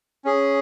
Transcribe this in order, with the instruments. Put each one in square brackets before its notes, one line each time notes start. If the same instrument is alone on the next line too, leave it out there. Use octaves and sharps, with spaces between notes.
[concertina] C#4 G#4